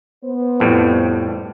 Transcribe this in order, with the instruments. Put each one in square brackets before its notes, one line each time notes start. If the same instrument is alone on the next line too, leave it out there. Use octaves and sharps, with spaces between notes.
[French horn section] B3 C5
[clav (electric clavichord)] F2 A2 G3